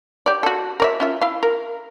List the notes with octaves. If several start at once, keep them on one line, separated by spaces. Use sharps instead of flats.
G4 D5
F#4 A4
A#4 D5 E5
C#4 F4 E5
E4 F5
A#4